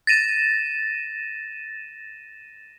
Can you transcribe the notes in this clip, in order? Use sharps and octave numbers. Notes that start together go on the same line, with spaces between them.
A6 A#6 D#7 E7